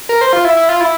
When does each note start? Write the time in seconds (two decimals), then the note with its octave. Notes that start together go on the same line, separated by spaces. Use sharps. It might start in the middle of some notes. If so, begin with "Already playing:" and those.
0.09 A#4
0.21 C5
0.33 F4
0.45 E4
0.57 E4
0.69 F4
0.81 E4